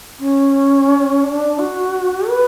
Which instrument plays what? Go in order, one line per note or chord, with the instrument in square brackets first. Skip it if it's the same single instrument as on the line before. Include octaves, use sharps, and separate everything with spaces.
[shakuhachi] C#4
D4
F#4
B4